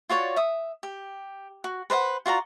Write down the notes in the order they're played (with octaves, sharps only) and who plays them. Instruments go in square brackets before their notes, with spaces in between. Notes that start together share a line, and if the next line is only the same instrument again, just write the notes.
[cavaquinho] F4 F#4 C#5 D5
E5 D#6
G4
F#4
B4 C5 D5 F#5
F4 F#4 D5 A#5